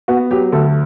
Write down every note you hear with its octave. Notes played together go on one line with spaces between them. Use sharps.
B3 F#4
F#3 G4
D2 A4